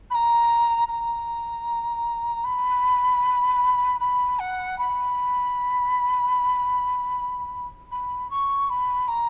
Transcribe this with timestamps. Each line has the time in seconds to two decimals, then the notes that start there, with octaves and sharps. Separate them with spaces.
0.10 B5
0.14 A#5
0.88 A#5
2.44 B5
4.00 B5
4.39 F#5
4.78 B5
7.91 B5
8.30 C#6
8.70 B5
9.08 A#5